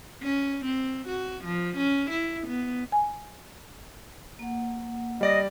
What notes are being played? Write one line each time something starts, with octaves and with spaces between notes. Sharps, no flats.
C#4
C4
F#4
F3
C#4
E4
B3
G#5
A#3 F#5
G3 D5 D#5 A#6